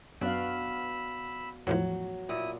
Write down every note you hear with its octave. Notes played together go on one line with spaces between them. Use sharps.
F#2 B3 D4 F#4 D5 F5 B5 E6
E2 A2 F3 F#3
A#2 E4 D#6